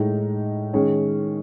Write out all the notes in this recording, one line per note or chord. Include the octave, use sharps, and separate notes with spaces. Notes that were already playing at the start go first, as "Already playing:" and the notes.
Already playing: A2 G#3 D#4
D#3 G#3 C#4 G#4 C#5